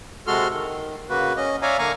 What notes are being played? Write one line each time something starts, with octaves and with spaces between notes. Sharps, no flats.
C3 G#3 F#4 A4 C6 F6
D#3
C#3 A#3 F#4 B4
C#4 D#5
C#5 D5 E5 F5 G#5 A#5
D3 A#3 F5 G#5 A#5 C#6